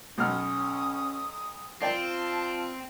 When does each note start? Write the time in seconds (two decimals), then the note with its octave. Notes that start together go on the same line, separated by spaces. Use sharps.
0.18 B1 C#4 D#6 F6
1.82 C4 F4 D5 G5 A5